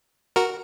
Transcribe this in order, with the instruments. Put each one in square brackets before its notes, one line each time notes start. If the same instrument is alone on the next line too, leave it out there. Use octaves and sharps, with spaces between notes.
[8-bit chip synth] F#4 A#4